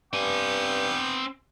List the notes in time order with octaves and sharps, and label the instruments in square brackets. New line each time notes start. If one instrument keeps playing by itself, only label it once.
[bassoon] G2 [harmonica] B3 G5 D6 [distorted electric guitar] C4 G#5